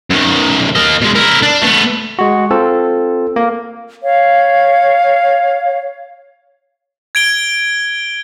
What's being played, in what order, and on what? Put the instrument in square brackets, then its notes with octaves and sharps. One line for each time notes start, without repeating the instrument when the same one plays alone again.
[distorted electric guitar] F#2 D#3
A#3 D#5
B2 G#3
E4 A#4
D4
A3 B3
[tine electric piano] G#3 F#4
C4 F4 A4
A#3
[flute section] C#5 F5
[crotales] G#6 D7 G7